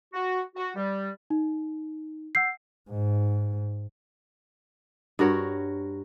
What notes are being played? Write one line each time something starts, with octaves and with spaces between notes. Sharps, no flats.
F#4
F#4
G3
D#4
F#5 E6 G6 C7
G#2
G2 F#4 A#4 C#5